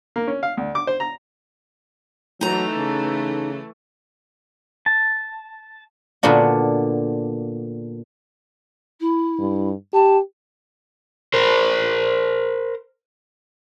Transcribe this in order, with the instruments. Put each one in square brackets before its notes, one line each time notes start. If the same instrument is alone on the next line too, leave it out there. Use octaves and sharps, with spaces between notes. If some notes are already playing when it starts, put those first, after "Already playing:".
[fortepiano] A#3
C#4
F5
D2
D6
C5
A#5
[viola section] E3 A3 [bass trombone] F#3 [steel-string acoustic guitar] D#4 A#5
[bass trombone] C#3
[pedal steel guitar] A5
[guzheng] A#2 D3 B3 D4 F#4
[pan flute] E4
[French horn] G2
[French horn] G4 [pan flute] A5
[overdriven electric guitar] A#4 C5